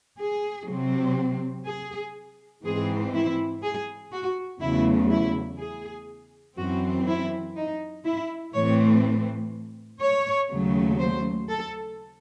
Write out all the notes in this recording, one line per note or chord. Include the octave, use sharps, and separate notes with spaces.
G#4
C3 F#3 C4
G#4
G#2 E3 C4 G#4
E4
G#4
F#4
E2 C#3 F#3 A3 E4
E4
G#4
F#2 E3 C4 F#4
E4
D#4
E4
A2 E3 A3 C4 C#5
C#5
D#2 C#3 F#3 A3
C5
A4